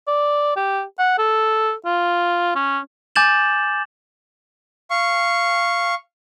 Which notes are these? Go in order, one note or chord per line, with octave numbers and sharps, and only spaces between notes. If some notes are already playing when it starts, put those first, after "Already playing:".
D5
G4
F#5
A4
F4
C#4
G#5 D6 G6 A6 E7 F#7
F5 C#6